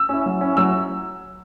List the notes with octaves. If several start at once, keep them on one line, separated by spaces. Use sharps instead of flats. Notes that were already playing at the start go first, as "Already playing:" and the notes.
Already playing: E6
C#4 E4
F#3
C#4 E4
F#3 E6